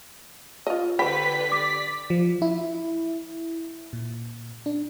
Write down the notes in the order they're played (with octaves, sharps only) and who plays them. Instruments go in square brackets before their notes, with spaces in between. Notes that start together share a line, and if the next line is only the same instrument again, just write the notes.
[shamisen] F4 D#5
[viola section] D3 G4 B4 [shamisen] C5 G5 [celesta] B5 [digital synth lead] B6
[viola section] D5 [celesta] D6
[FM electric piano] F3
E4
A#2
D4